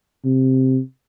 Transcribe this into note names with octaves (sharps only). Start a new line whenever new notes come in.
C3